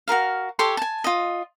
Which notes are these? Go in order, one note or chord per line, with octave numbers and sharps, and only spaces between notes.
F#4 G#4 A#4 F5
G4 A4 C#5 C6
G#5 A5
F4 D#5